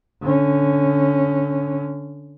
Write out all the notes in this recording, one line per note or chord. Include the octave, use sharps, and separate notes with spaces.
D3 C#4